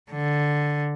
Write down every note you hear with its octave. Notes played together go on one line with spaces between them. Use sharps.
D3